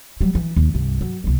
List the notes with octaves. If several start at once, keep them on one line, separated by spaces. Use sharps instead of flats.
F#3 G3
E3
D#2
C2 G2
F#3
C2 A#3